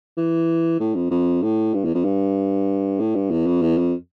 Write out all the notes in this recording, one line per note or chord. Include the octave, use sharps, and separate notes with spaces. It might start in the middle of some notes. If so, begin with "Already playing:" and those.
E3
A2
F2
F2
A2
G2
E2
F2
G2
A2
G2
E2
F2
E2
F2